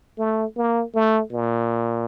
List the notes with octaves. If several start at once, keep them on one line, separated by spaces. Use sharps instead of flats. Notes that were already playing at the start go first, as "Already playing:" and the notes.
A3
A#3
A3
A#2